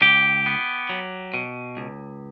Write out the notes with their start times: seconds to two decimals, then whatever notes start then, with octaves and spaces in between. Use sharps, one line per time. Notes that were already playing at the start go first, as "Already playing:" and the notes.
0.02 C#2 G4
0.46 B3
0.89 F#3
1.34 B2
1.77 C#2